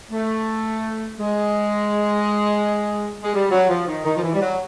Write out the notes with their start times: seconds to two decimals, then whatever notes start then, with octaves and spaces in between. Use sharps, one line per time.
0.12 A3
1.19 G#3
3.23 G#3
3.33 G3
3.51 F#3
3.69 F3
3.87 D#3
4.04 D#3
4.16 F3
4.22 E3
4.33 G3
4.40 F#3